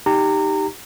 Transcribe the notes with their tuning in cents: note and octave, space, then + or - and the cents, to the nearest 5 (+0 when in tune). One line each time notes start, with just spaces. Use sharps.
D#4 +0 G4 +0 A#5 -25